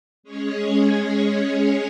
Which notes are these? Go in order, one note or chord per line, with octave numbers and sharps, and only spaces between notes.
G#3 C#4 G#4 C#5